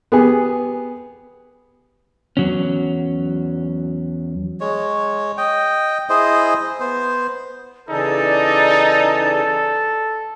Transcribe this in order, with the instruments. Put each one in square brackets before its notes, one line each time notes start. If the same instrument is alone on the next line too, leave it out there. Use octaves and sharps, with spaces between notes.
[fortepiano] B3 G4 G#4
[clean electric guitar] E2 F#3 C#4
[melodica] G#3 C#5
D#5 G5
E4 G#4 C5 D#5
B3 C5
[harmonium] C#3 E3 G#4 [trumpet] D#4 [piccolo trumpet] A4 [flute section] D5